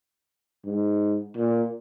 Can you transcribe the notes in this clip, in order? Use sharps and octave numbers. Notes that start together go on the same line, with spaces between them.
G#2
A#2